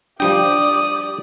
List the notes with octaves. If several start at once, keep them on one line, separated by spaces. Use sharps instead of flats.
F3 G3 D4 G4 D5 G5 D#6